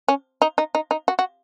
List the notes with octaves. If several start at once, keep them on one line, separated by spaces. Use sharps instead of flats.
C#4
D#4
D#4
D#4
D#4
F#4
F#4